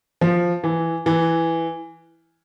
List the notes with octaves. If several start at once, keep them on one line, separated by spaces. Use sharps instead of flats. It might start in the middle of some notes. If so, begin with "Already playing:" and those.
F3
E3
E3